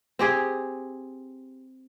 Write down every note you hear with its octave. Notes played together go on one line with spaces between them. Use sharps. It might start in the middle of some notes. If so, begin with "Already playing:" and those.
C4 G4 G#4